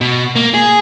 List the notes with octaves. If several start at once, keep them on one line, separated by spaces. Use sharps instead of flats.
B2
A#3
G#4